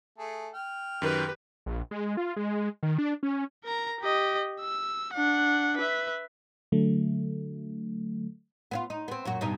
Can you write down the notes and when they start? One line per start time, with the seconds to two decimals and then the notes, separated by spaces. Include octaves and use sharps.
0.19 A3 G#4
0.54 G5 F6
1.02 F#2 D#3 G4 B4
1.66 A#1
1.91 G#3
2.17 F4
2.36 G#3
2.83 D#3
2.98 D4
3.23 C#4
3.64 A#4 A#5
4.01 G4 D#5
4.61 E6
5.14 D4 F#5
5.77 B4 E5
6.72 D3 F#3 A3
8.71 B3 C4 F4
8.90 D#4
9.08 B3 C4
9.25 F#2 A#2 F#4
9.41 G2 B2 D#4